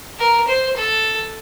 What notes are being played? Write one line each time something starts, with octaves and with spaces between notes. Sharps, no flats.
A#4
C5
A4